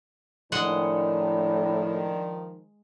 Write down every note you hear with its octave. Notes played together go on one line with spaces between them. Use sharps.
A2 D#3 F3 G#3 D4 F#5